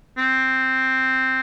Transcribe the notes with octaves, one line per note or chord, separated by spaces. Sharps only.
C4